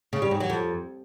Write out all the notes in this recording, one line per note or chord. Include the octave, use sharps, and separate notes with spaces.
C#3
G3
G#2
F#3
F2